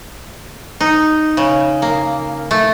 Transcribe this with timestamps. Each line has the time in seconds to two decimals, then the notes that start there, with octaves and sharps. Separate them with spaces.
0.81 D#4
1.37 C#3
1.82 A#3
2.51 A3